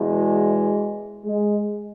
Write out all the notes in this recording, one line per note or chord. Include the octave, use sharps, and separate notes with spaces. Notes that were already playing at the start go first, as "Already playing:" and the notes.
Already playing: E2 B2 G#3
G#3